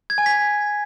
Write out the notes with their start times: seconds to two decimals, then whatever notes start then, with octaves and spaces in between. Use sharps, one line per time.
0.10 G#6
0.18 G#5
0.26 B6